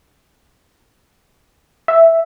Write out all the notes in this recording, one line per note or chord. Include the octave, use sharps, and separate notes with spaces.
E5